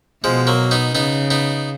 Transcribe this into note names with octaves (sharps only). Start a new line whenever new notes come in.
B2 F3 G#3
F#3 A#3
B3 D#4
C#3 B3 D#4
B3 D#4